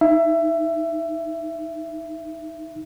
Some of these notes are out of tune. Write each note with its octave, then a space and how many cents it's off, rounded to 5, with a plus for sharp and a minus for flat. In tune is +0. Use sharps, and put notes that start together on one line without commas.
D#4 +10 E5 +20